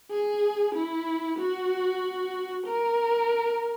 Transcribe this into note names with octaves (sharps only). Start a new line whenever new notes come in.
G#4
E4
F#4
A#4